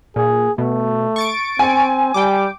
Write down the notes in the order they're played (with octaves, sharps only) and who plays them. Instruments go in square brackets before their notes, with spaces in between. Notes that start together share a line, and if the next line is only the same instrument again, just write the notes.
[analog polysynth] A#2 [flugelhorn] G#4
[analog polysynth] B2 [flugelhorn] A3
[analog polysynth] C#6 A6 D7
[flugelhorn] C4 [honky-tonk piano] G#5
[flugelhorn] G3 [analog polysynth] G5 D6